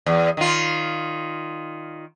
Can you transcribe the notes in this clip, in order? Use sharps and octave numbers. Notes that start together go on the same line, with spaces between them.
E2
D#3 F4